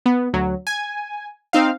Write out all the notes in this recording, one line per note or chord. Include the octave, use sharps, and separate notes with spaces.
B3
D2 F#3
G#5
C4 D#4 F5